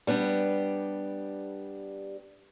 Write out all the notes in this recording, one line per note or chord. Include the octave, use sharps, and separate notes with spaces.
G3 B3 D4 G4